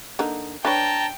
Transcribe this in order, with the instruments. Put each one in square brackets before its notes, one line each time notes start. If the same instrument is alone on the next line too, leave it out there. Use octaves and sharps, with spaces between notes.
[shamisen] D3 A#3 D#4
[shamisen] D4 B4 C#5 [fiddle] G5 [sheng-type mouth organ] A5 A#5